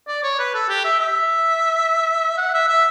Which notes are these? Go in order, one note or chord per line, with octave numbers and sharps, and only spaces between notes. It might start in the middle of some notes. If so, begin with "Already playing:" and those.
D5
C#5
B4
A4
G4
E5
E5
F#5
E5
E5